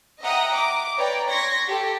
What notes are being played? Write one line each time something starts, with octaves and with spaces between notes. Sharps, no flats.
D#5 E5 F#5 G5 A#5 D#6
D6
B4 C#5 D5 G5 A#5
C6 C#6 G#6 A#6 B6
G4 A4